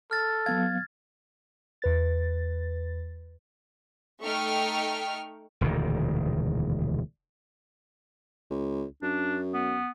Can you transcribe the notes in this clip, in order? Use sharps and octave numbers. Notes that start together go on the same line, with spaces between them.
A4 F6 A6
F#3 B3 F5 G#6
E2 B4 A6
A3 D#4 G5 C#6 F6
E1 D2 A#2 D#3
C#2
F#2 D4
B3